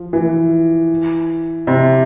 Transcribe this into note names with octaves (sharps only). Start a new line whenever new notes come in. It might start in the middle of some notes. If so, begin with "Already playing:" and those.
Already playing: F3
E3
C3